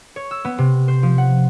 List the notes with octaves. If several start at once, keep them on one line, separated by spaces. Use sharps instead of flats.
C#5
E6
B3
C3
C5
F3
F#5